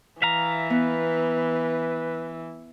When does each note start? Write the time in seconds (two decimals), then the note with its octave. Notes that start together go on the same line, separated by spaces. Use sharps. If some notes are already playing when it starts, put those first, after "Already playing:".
0.22 E3 E5 F5 A#5
0.70 B3 B4